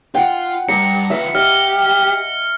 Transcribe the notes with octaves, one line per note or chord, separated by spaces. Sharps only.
F4 F#5 G5
G2 A#5 C#7
F4 B4 E5
G4 D#5 F6